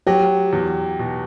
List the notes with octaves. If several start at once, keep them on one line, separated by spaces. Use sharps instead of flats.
F#3 G4
E2
B2